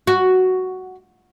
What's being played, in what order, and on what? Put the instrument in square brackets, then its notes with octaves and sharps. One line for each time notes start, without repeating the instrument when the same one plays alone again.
[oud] F#4